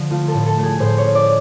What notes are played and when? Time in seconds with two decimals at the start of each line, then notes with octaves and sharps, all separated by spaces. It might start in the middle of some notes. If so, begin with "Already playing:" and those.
Already playing: D3 F3
0.10 A3 F4
0.28 A4
0.34 A2
0.46 A4
0.58 A3
0.63 G#4
0.80 A2 C5
0.98 C#5
1.04 C#4
1.15 D5